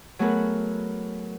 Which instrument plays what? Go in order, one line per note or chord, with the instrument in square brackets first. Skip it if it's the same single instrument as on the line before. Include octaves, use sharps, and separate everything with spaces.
[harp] F#3 A3 B3 G#4 A#4 B4